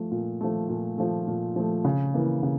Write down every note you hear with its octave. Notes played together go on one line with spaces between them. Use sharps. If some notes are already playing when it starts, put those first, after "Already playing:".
Already playing: F3 A3
A#2
F3 A3
A#2
F3 A3
A#2
F3 A3
C#3
E3 A#3
C#3